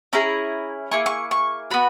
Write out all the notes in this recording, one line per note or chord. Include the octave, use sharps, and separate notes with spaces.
C#4 E4 G#4 A#5
A#3 E4 G#4 C#6
C#6
C#6
B3 F#4 B5